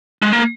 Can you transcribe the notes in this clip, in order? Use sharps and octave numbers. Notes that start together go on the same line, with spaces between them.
G#3
A#3